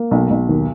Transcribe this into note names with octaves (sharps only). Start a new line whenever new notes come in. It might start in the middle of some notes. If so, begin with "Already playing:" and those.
Already playing: A#3
B1
B1
D#2